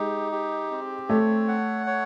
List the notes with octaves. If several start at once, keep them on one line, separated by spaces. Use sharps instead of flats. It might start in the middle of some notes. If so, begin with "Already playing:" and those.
Already playing: G#3 D#4 G4
G4
C4
A3 C#5
F#5
C#5